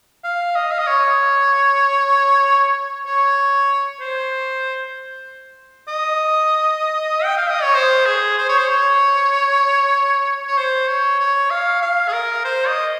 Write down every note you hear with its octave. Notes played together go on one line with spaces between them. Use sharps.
F5
D#5
F5
D#5
C#5
C#5
C5
D#5
G5
F5
D#5
C#5
C5
G#4
C5
C#5
C5
C#5
C#5
C5
C#5
C#5
F5
F5
G#4
A#4
C5
D#5